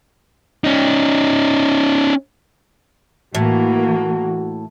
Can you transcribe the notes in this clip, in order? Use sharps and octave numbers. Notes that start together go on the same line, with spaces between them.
C#4 D#4
A2 E3 A#3 F#4